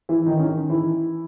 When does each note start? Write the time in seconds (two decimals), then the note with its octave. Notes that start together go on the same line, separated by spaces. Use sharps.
0.09 E3 E4
0.26 D#3 D#4
0.37 C#4
0.43 D#3 D#4
0.70 E3 E4